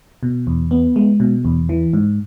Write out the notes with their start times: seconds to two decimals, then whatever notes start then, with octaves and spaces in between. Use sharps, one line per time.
0.23 B2
0.47 E2
0.71 B3
0.96 G#3
1.20 B2
1.45 E2
1.69 E3
1.93 G#2